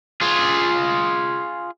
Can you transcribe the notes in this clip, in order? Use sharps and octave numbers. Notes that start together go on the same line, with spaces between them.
F4 G#4